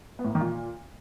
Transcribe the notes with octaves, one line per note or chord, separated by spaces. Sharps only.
B3
A2
A#3
D#3
A#2